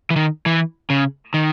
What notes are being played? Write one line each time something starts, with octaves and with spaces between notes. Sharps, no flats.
E3
D#3
E3
C#3
D#3